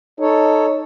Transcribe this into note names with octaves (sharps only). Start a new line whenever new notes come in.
D#4 A4 C#5